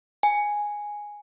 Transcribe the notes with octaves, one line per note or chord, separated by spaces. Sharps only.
G#5